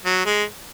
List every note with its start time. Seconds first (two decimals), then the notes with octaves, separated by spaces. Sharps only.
0.05 F#3
0.26 G#3